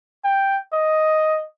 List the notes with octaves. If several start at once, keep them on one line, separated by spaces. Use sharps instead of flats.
G5
D#5